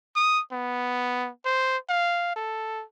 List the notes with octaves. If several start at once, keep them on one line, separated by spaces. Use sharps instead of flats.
D#6
B3
C5
F5
A4